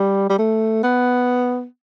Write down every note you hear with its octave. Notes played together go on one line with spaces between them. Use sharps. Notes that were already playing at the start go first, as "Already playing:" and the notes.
Already playing: G3
G3
A3
B3